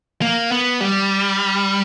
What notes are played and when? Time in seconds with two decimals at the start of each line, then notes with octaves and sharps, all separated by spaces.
0.22 A#3
0.51 B3
0.81 G3